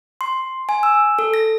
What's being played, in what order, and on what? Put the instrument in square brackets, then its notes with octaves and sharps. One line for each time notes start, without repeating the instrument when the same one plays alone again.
[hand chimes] C6
G#5
E6
A4
A#6